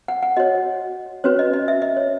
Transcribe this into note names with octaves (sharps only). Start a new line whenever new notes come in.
F#5
F#5
F#4 C#5 D#5
C#4 F#4 B4 C#5
D#5
D#5
E5
D#5
C#5